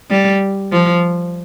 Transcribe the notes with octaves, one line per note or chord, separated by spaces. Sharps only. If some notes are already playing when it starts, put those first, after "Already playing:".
G3
F3